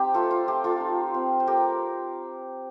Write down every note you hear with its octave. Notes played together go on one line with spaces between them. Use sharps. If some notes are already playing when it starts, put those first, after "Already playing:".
Already playing: C4 D#4 G4
A3 F4 A4
F4
A3 G4
F4 A4
D#4
C4
C5
A3 G4 A#4